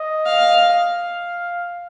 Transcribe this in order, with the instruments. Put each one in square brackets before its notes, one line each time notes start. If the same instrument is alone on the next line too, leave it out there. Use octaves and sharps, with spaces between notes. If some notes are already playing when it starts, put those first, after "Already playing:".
Already playing: [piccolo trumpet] D#5
[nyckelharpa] F5
[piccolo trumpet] F5